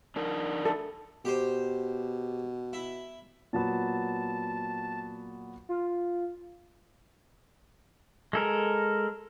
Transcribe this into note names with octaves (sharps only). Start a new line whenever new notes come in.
D4 D#4 A#4
A4
B2 G4 C5
E4
A#2 F#3 B3 A5
F4
G#3 A4 A#4